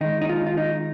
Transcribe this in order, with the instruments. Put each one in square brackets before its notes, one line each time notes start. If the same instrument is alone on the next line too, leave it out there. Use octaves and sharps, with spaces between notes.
[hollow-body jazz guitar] D#3 G#3 D#4
D#4
F4
F4
D#4